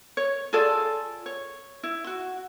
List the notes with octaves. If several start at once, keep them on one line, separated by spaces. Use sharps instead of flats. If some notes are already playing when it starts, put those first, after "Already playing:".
C#5
F4 G#4 A4 D5
C#5
E4
F#4